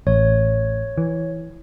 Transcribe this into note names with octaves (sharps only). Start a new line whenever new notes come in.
A1 C#5
E3